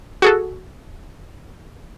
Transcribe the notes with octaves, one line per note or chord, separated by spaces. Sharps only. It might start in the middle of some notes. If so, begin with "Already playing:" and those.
F#4 G#4 A4